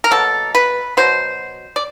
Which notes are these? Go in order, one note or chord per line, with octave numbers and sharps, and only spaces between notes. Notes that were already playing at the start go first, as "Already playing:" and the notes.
A#4
B2 F#3 A#3 A4
B4
B2 F#3 C5
D5